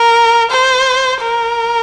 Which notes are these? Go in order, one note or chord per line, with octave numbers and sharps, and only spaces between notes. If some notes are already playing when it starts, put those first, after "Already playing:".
Already playing: A#4
C5
A#4